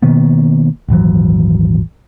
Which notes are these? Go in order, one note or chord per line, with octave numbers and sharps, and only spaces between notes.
B2 D#3 A#3 B3
D#1 G#1 E3 F#3